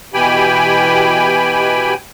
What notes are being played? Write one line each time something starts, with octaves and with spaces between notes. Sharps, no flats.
B2 E3 G4 G5 G#5 B5